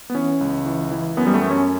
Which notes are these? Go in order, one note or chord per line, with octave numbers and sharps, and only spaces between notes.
B3
E3 C#4
C#2
E3
E3
F#2 B3
G3
A3
F#2
C#4